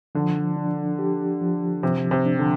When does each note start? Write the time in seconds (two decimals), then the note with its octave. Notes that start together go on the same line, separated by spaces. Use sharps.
0.15 D3 F3
0.56 D4
0.99 G4
1.41 F3
1.83 C3 F3
2.11 C3
2.26 D4
2.39 D3